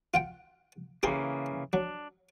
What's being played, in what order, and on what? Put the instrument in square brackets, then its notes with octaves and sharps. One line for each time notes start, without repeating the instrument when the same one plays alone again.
[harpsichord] F4 F#5 G5
[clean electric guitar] C#3 E3 A#3 [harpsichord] G4 G#4 C6
[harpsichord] F#3 [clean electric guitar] D4